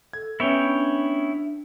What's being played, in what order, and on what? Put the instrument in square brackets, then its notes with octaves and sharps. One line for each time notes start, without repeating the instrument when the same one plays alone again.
[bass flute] A4 [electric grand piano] G#6
[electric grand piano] B3 C#4 [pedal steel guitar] E4 C#5 G5 [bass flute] E5
[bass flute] D4